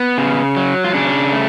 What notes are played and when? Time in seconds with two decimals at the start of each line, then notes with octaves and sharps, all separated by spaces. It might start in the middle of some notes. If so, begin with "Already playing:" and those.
Already playing: B3
0.18 C#3
0.56 F#3
0.84 F4
0.94 C#3 D4
1.33 A3